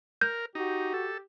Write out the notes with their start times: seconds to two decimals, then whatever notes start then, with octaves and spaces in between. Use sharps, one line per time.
0.21 A#4 G6
0.55 D#4 F#4 G4
0.94 A4